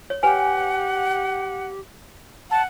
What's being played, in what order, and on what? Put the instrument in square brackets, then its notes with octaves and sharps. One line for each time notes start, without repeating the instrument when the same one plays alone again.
[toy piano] C#5
[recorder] G4 [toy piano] B4 G#5 [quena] F#5
[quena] F#5 [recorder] A5